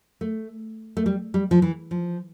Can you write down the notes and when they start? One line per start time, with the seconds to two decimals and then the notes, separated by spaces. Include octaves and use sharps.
0.21 A3
0.97 A3
1.06 G3
1.34 G3
1.51 F3
1.62 E3
1.91 F3